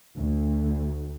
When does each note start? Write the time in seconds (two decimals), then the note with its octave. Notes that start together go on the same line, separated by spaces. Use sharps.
0.18 D2